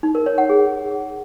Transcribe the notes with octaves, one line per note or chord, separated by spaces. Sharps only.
D#4
A#4
C#5
F#5
G#4